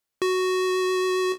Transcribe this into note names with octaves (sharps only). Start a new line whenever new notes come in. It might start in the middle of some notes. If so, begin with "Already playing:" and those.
F#4